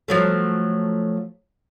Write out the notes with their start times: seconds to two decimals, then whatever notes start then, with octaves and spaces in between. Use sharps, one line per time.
0.08 F3 F#3 A3